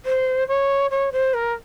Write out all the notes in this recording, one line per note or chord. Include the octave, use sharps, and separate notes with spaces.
C5
C#5
C#5
C5
A#4